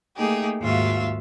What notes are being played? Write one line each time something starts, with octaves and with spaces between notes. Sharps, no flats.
A3 A#3 D#4 G4 G#4
D#2 G#2 F4 F#4 E5 F5